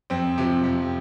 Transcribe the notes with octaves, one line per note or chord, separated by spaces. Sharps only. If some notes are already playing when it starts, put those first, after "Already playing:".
F2 C4
C3 F3
F2